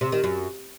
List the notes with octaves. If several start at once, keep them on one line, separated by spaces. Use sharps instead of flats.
C3
D#3
F#2